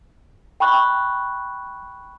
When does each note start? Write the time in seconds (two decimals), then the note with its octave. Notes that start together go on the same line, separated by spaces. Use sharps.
0.60 G5 B5 C#6 F#6